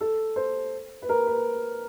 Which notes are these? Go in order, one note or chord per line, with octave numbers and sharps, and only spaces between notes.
A4
C5
B4
A#4
B4